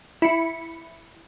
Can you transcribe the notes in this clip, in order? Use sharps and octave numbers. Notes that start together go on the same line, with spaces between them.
E4 B5 C#7